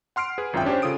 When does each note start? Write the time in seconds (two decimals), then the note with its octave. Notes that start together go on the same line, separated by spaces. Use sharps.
0.16 F#5 C6 F6 C7 D7
0.38 G#4 B4
0.53 G#1 F#2 F4 E5 G5
0.65 C#4 D4 G4 C5
0.82 C#3 F4 A4 D#6 D7